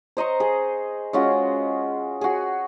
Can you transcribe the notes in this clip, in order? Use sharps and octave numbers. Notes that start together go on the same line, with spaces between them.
C5 D#5 A#5 C#6
G#4
G#3 C#4 F4 F#4
F#4 G#4